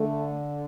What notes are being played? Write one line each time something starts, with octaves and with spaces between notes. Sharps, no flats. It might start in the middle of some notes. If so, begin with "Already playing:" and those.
Already playing: D3 A3